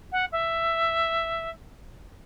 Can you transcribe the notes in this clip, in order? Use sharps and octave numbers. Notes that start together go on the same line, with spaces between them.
F#5
E5